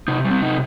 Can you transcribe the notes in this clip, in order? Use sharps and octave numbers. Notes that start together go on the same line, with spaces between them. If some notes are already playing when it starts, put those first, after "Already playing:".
C3 D#4
G3
C4
C3 D#4